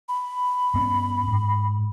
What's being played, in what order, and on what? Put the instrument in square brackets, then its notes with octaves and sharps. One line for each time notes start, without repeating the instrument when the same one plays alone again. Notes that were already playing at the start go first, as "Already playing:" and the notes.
[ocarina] B5
[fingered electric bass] G2 B3 C#4
G#2